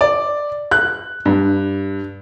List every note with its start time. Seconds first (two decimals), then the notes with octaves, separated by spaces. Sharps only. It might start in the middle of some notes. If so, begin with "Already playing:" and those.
0.01 D5
0.71 F#6
1.25 G2